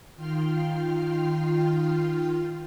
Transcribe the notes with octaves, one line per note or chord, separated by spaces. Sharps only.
D#3 F4 G5 C6 F6